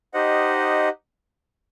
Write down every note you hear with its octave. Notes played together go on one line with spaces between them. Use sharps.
D#4 G4 C5 D#5 F#5